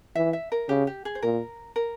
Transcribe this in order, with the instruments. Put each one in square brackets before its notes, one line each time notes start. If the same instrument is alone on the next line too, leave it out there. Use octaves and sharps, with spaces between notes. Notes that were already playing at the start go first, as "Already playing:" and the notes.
[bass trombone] E3 [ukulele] E5
[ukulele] E5
A#4
[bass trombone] C#3 [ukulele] G4
[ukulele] G4
G#4
C5
[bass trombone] A#2 [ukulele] A#4
[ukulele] A#4